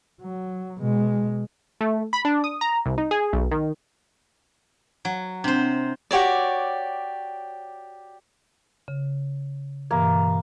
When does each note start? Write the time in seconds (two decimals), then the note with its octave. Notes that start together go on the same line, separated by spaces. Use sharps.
0.21 F#3
0.78 B2 G#3
1.81 A3
2.13 B5
2.25 D4
2.44 D#6
2.61 A#5
2.86 C2
2.98 D#4
3.11 G#4
3.33 B1
3.51 D#3
5.05 F#3
5.44 C3 C4 D4 C5
6.11 F#4 G4 C#5 D5
8.88 C#3
9.91 G2 B2 E3 A#3